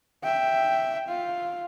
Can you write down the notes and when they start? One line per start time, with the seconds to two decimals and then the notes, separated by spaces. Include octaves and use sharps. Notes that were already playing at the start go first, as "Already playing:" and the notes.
0.23 E5 G5
1.09 F4